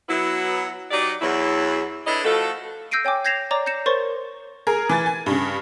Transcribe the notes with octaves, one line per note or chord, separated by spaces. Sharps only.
F#3 B3 E4
F#3 D#4 G4 D5
E2 F#3 E4
D4 E4 A4 B4 C#5 D#5
F3 A3 F#4 A4
E6 G6 A#6 C7 D7 D#7
C#5 G5 G#5 D6
G6 G#6 A#6 C7 E7 F7
C#5 D5 A#5 D6
G6 A#6 C#7 E7
A#4 C5 C#5 C6 C#6 A6
G#4 A#4
E3 G#5 A6
G#5
G2 C#3